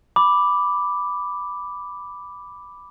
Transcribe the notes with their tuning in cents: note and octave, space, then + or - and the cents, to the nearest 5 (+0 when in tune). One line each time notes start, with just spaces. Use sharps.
B5 +0 D6 +0